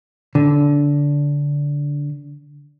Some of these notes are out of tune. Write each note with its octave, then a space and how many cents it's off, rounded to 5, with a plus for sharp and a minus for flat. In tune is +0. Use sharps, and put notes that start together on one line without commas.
D3 -20